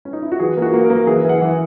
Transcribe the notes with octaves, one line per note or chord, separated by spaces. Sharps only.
C#4
D#4
E4
F#4
E3 G#4
A#3
F#4
A#3
A#4
A#3
E3 G#4
E3 F#5
E3